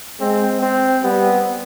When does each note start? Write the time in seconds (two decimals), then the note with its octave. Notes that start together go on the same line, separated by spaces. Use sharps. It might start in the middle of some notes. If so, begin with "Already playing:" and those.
0.20 G#3 C4
0.61 C4
1.03 G3 B3